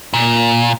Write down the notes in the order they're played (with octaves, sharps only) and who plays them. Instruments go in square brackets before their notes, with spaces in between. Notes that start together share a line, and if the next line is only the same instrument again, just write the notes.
[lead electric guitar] A#2